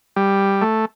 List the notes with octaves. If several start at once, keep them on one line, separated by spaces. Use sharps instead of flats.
G3
A3